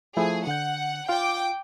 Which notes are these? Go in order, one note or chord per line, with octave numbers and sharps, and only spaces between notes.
F3 A3 E4 G#4
D3 F#5 G6
F4 F5 G5 D6